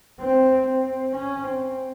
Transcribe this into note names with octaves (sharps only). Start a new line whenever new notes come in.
C4
C4
C#4
C4